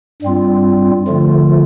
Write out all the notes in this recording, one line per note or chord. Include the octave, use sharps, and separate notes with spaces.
G2 G3 C4 F4
D3 F3 A3 F4